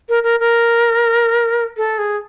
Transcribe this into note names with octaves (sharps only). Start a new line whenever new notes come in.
A#4
A#4
A#4
A4
G#4